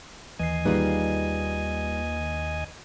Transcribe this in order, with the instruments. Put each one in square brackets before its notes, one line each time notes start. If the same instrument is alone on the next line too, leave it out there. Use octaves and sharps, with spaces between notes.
[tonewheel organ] D#2 D#5 G#5 [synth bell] E3 C7
[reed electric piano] D#3 F4 [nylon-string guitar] G3 D#4 G#4 [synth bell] A#3 B4